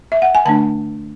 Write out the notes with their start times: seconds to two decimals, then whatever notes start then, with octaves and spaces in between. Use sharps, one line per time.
0.12 E5
0.22 F#5
0.35 G#5
0.45 D3 A3 D4 A5